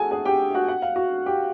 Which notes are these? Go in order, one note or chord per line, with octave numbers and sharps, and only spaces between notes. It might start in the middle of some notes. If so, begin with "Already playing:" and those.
Already playing: F#4 G#4 A4 F#5 G#5 A5
G#4 G#5
G4 G5
F#4 F#5
F#5
F5
F#4 F#5
G4 G5